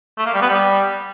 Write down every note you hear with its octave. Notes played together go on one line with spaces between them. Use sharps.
A3
A#3
G3
B3
G3